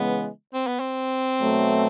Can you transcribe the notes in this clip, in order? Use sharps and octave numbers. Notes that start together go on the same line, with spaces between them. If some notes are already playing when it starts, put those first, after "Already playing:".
Already playing: C#3 E3 G#3 B3
C4
B3
C4
B2 F#3 A3